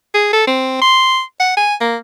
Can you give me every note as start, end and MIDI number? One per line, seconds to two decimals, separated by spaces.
0.14 0.29 68
0.33 0.46 69
0.47 0.80 60
0.82 1.21 84
1.40 1.54 78
1.57 1.75 80
1.81 1.96 58